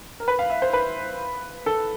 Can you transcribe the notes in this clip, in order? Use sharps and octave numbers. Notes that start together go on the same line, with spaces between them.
A#4
B4
F5
E5
C5
B4
A4